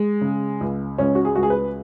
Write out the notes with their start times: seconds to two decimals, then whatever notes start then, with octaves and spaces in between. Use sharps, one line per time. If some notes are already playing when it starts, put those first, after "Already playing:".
Already playing: G#3
0.21 C#3
0.61 C#2
0.98 C#2 C#4
1.15 F#4
1.25 G#4
1.35 C#2 F#4
1.43 G#4
1.50 B4